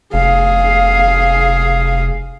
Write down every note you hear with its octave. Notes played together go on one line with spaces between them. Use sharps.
F1 G#4 F5